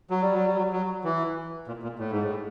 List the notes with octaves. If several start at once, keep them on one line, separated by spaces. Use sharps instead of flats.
F#3
G3
F#3
G3
F#3
F#3
E3
A#2
A#2
A2
G#2
A2